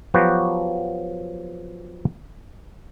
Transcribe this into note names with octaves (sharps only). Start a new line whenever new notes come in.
F3 F#3 B3 F#4 G4